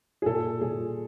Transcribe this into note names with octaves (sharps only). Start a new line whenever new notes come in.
G#4
A#2 A4
A#2 G#4